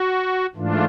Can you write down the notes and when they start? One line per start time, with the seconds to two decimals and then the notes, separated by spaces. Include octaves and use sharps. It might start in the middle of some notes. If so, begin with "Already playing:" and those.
Already playing: F#4
0.55 G#2 E3 A3 D4 F4